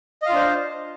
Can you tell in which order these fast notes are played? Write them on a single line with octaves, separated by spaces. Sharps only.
D#5 F5 F4 D4 C5